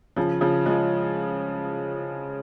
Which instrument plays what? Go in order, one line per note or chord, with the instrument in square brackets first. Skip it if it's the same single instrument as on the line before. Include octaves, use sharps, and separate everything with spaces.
[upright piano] C#3 F3
C#3 F3
F3 G#3